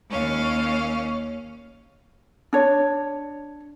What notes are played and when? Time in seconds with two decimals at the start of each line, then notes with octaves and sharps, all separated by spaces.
0.10 D#2 C#4 F5
2.53 D4 C#5